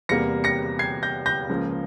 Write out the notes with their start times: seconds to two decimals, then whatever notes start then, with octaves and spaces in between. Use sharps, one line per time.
0.09 E2 C3 G3 A#3 A#6 C#7
0.44 A#6 C#7
0.79 G#6 C7
1.03 G6 A#6
1.26 G6 A#6
1.49 C#2 C#3 F3 A#3